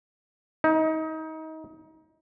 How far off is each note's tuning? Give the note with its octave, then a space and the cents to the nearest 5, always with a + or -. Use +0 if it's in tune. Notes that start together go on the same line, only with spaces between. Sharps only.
D#4 +30